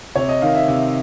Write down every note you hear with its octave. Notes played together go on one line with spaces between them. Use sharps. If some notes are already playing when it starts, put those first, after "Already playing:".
C3 C#5
D#5
D#3 F5
E5
C3